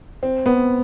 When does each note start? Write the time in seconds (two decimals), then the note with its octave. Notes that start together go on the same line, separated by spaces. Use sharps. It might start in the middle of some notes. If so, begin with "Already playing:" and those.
0.23 C4
0.46 B3